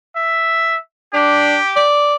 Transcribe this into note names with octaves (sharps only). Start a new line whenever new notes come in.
E5
D4 G4
D5